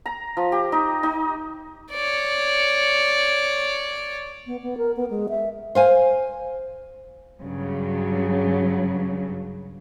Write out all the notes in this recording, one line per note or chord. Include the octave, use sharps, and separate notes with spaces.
A#5
F3
G4
D#4
D#4
C#5 D5
B3
B3
A#4
B3
G#3
E5
C5 F5 G#5
G2 C#3 F#3